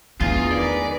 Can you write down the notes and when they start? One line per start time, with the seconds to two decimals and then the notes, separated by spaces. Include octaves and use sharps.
0.21 E2 A3 D4 F4 G#4
0.51 D#3 B4 D5